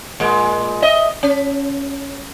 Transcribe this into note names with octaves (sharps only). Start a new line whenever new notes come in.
A#2 G#3
D#5 E5
C#4